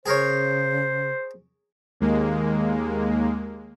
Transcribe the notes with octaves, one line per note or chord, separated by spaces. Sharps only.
C#3 G#4 A#4 C5 C#5
D#2 G#3 A#3